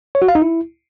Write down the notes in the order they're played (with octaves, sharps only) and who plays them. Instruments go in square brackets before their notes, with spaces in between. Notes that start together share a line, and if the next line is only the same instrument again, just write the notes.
[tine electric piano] C#5
F#4
F5
D#4
E4